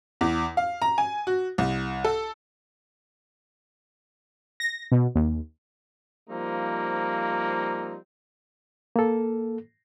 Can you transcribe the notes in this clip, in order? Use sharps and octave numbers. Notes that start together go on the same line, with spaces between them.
E2
F5
A#5
G#5
F#4
C2
A4
A#6
B2
D#2
F3 G3 A#3 C4 D#4
A#3 A4